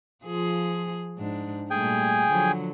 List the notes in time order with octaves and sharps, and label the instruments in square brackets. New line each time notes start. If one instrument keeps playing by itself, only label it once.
[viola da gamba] F3 F4 G#4
G#2 D4
[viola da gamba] A#2 G3 A3 [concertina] G#4 G5 G#5
[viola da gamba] D3 F3 F#3